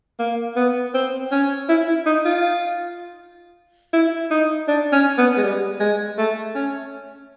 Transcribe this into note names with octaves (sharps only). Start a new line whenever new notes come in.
A#3
B3
C4
C#4
E4
E4
D#4
F4
E4
D#4
D4
C#4
B3
G#3
G3
G#3
A3
C#4